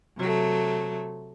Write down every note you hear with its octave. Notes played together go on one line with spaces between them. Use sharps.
C3 F#3 A3